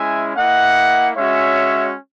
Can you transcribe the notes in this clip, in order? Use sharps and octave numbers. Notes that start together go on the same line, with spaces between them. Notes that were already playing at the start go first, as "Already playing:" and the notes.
Already playing: G#3 C#4 E4 E5 G#5
A#3 E4 D#5 F#5
G#3 C#4 F#4 C#5 E5